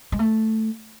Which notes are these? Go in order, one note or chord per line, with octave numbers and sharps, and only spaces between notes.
G#3
A3